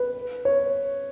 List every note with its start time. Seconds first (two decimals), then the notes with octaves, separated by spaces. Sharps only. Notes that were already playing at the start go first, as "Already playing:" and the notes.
Already playing: B4
0.45 C#5